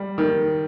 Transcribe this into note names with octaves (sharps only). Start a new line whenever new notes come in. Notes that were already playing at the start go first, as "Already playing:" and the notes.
Already playing: G3
D#3